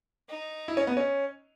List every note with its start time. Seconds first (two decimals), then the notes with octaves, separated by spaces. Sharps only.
0.29 D#4
0.68 E4
0.77 C#4
0.87 B3
0.97 C#4